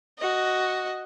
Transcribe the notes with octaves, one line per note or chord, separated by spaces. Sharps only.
F#4 D#5